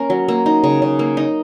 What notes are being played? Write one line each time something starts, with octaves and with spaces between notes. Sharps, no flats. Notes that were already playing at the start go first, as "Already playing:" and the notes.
Already playing: A#3 C#4 A#4
F#3
A#3
D#4
C#3
C#3
A#3
D#4